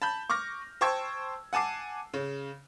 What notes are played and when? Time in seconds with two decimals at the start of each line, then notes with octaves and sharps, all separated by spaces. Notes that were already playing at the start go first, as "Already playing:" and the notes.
0.02 A5 B5 G6
0.30 C#6 D6 F6 A#6
0.81 C5 G5 A5 C#6 E6 G#6
1.53 F#5 G#5 A5 D6 C7
2.14 C#3